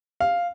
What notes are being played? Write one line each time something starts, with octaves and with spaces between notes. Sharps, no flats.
F5